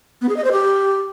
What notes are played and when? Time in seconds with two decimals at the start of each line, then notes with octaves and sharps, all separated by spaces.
0.21 B3
0.29 G#4
0.37 D#5
0.44 C5
0.52 G4